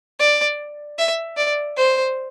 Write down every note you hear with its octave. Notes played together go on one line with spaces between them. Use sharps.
D5
E5
D5
C5